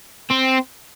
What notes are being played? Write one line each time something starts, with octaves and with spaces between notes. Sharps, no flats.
C4